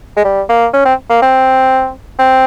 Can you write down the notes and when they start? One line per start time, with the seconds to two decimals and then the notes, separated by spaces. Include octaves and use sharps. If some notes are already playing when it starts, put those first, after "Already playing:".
0.17 G#3
0.24 G3
0.49 A#3
0.74 C#4
0.85 C4
1.10 A#3
1.22 C4
2.19 C4